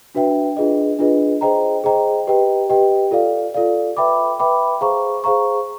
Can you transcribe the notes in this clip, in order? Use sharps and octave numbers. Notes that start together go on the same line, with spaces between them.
D4 F#4 B4 E5 G5
D4 F4 G#4 B4 D#5
D4 F4 G#4 B4 D#5
G#4 C5 D#5 G5 A#5
G#4 C5 D#5 G5 A#5
G4 B4 D#5 G5
G4 B4 D#5 G5
F4 A4 D5 F5
F4 A4 D5 F5
B4 E5 G5 B5 D6
B4 E5 G5 B5 D6
G#4 C5 F5 A#5 C#6
G#4 C5 F5 A#5 C#6